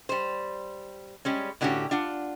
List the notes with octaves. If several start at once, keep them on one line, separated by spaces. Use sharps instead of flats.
G3 C5
G3 G#3 C#4
A2 D3 C#4 F#4 G4
D4 F4 F#5